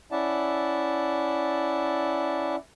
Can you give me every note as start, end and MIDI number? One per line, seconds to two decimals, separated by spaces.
0.12 2.56 61
0.12 2.56 64
0.12 2.56 74
0.12 2.56 76
0.12 2.56 78
0.12 2.56 81